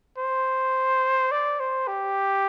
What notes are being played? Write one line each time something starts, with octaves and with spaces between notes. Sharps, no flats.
C5
D5
C5
G4